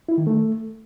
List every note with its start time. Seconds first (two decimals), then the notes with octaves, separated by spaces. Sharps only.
0.09 E4
0.18 D#3
0.27 A3